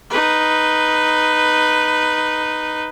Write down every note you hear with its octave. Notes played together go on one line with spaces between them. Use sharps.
D#4 B4